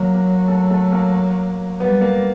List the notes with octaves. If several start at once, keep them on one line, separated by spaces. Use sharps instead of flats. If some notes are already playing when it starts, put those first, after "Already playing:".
Already playing: F#3 A#3 A#4
A#3 A#4
A3 A4
A3 A4
A#3 A#4
G3 B3 B4
A#3 A#4